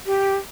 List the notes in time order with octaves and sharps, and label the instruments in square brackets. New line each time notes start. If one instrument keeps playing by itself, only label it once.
[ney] G4